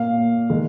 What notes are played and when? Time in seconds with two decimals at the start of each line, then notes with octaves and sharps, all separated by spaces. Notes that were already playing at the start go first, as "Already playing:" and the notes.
Already playing: A#2 A#3 F5
0.50 D#3 G#3